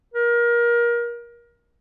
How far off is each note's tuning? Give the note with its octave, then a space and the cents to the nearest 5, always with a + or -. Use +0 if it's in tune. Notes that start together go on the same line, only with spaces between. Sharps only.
A#4 +25